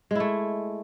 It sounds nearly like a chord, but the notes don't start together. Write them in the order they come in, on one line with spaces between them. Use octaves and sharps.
G#3 E4 A3